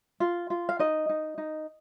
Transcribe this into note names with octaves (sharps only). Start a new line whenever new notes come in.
F4
F4
F5
D#4 D#5
D#4
D#4